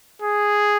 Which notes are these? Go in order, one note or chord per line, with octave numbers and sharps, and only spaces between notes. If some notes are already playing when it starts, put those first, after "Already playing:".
G#4